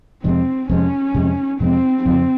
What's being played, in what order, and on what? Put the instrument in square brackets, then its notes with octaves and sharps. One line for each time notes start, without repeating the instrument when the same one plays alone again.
[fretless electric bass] F2 C3 F3 G#3 [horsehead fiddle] C4
[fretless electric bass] F2 C3 F3 G#3 [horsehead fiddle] C#4
[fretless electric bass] F2 C3 F3 G#3
[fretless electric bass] F2 C3 F3 G#3 [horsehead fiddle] C4
[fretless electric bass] F2 C#3 F3 [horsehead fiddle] C4